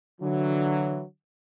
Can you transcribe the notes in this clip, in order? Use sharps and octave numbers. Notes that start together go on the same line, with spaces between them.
D3 E3 F#3